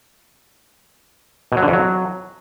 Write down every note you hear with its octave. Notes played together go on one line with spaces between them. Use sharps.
B2
F#3
D3
F2
F#3